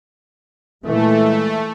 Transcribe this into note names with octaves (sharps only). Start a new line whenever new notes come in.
A#2 E3 G#3 A3